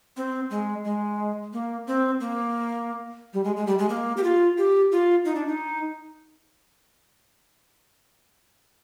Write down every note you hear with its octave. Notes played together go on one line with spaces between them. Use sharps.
C4
G#3
G#3
A#3
C4
A#3
G3
G#3
G#3
G3
G#3
A#3
G4
F4
G4
F4
D#4
D4
D#4